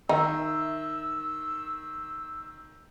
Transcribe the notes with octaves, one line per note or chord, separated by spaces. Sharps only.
D#3 D#4 E5 E6